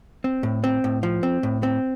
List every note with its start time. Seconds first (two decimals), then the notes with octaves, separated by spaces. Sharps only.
0.24 C4
0.43 A2
0.64 C4
0.84 A2
1.03 F3
1.23 C4
1.43 A2
1.63 C4